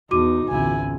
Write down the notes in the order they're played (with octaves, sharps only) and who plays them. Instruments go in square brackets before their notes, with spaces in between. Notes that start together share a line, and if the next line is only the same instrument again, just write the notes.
[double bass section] E2 [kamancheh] D#4 [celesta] F#4 D6 D#7
[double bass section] G#1 C#2 B2 [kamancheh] E4 G#5